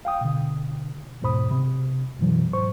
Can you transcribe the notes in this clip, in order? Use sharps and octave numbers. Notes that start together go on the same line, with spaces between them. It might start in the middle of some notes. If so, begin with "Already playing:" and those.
F5 G5 D#6
B2 D3
E2 G#2 B2 C5 B5 D#6
C3
F#2 B2 E3 F#3
G#2 C5 C#6